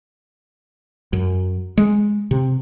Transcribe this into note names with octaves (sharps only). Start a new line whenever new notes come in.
F#2
G#3
C3